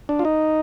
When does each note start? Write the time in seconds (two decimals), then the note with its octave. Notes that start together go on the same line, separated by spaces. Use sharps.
0.09 D4
0.19 F4
0.25 D#4